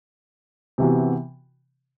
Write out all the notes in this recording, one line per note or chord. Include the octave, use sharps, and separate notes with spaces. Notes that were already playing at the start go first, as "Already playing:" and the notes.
C3 E3 B3 F#4